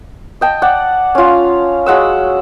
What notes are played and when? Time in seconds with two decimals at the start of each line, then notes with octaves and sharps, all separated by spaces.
0.41 D#5 G5 A5
0.62 D5 F#5
1.15 C#4 F4
1.86 F#3 G#3 F#5 E6